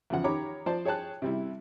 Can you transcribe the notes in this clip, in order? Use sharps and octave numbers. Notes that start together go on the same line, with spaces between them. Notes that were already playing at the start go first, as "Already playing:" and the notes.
E2 C#3 F3 F#5
D#3 G4 C#5 A#5 B5 D6
F3 C5 D5 A5
G#4 C#5 G5 A5 F#6
C3 G3 E4